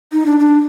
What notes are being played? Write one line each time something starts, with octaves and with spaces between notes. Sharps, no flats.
D#4
D4
D4